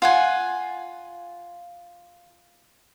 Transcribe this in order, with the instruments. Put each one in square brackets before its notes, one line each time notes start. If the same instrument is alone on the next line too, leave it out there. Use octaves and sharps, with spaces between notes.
[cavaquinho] F4 F#5 G#5